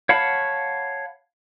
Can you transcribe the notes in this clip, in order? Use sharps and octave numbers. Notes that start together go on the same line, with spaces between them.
C#5 F5 F#5 A5 B5